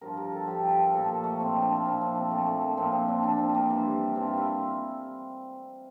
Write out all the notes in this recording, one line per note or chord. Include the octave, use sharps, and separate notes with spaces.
G2 F3 A#4
A#4
A4
G2 F3 G4
A4
A#4
A#2 F3 A4
A#3
A3
A#2 F3 C4
D4
C4
F4
A#2 F3 E4
D4
C4
A#2 F3 A3
A3
A#3
A#2 F3 C4
C4
D4
A#2 F3 D4
C4
A#3
G2 E3
G2 E3 C4
F4
E4